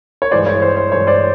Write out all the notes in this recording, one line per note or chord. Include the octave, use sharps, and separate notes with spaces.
C#5
G2 E3 G#3 C5 D5
C#5
C5
C5
G2 E3 G#3 C#5
C5 D5